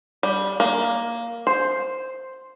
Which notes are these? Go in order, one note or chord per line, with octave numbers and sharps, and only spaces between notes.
G3
A#3
C5